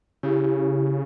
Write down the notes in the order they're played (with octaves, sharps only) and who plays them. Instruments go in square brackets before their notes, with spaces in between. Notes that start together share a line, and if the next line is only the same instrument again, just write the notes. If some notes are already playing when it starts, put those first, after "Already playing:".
[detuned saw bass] C#3 [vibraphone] E4 G4